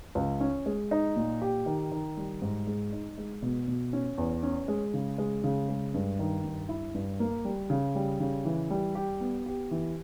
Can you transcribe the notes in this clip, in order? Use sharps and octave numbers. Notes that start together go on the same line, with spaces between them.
C#2
C#4
G#3
D#4
A#2
G4
D#3
D#3
G3
G#2
G#3
D#4
G#3
B2
B2
C#4
E2
C#4
G#3
C#3
G#3
C#3
G#3
G2
D#3
G2
E4
G2
A#3
G3
C#3
G3
C#3
E3
G3
G4
B3
G4
E3